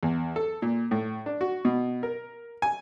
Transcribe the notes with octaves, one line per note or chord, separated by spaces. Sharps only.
E2
A4
A#2
A2
D4
F#4
B2
A#4
G#5